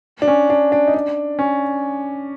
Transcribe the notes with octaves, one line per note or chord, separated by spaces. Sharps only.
D4
C#4
D4
D4
D#4
D4
C#4